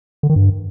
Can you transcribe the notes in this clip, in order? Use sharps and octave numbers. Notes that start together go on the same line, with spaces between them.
D3
D#3
G2